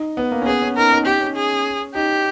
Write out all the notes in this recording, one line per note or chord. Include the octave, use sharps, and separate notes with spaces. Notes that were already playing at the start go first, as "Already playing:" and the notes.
Already playing: D#4
B3
A#3
C#4
B3 G#4
C#4
D#4 A#4
D#4
D#4 G4
C#4
G#4
D#4 G4